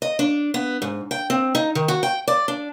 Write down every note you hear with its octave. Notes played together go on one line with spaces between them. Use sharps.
D#5
D4
B3
G#2
G5
C4
D#4
D#3
F#4
G5
D5
D4